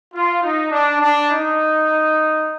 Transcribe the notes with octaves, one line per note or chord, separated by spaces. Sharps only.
F4
D#4
D4
D4
D#4